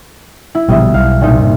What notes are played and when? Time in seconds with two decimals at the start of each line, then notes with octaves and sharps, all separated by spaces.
0.55 E4
0.68 A#1 B2 D3 G3 D#5 E5
0.94 B1 F5
1.21 C2 A#2 D#4
1.40 G2